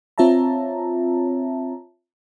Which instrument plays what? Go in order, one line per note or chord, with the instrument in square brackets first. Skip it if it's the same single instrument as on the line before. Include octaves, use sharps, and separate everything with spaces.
[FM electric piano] C4 F4 C#5 E5 A5 A#5